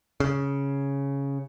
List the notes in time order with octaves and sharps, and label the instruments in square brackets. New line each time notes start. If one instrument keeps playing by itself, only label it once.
[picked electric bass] C#3